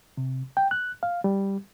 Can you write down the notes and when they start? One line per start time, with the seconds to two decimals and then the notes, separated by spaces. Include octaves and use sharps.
0.17 C3
0.57 G5
0.71 F#6
1.03 F5
1.24 G3